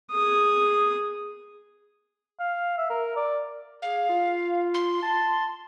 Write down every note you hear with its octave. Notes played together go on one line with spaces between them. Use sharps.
G#4 D#6
F5
E5
A#4
D5
G#4 F5
F4
C6
A5